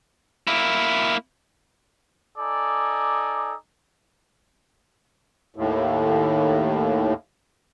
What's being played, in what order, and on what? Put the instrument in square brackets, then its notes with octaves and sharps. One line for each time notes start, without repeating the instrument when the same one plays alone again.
[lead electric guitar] A#3 E4
[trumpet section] D#4 A4 D5 G#5 D6
[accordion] D#2 A2